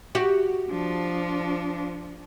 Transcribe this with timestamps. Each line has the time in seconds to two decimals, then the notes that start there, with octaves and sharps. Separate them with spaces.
0.15 F#4 G4
0.70 F3 D4